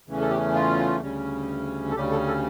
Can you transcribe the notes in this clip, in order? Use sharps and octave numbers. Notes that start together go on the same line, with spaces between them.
E2 C#3 E3 A3 C#4
A4
G4
F4
D2 C#3 G3 C#4
A4
D2 C#3 G3 C#4 G4
A4
A4